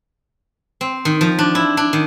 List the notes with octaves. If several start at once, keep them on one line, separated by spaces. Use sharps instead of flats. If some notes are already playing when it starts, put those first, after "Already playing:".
C4
D#3
F3
D4
E4
D4
D#3